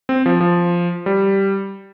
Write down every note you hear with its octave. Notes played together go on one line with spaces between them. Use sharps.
C4
F3
F3
G3